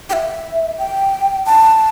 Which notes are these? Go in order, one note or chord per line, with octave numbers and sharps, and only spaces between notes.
G5
E5
G5
A5